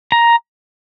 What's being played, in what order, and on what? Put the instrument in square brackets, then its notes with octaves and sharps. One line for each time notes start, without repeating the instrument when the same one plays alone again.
[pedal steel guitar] A#5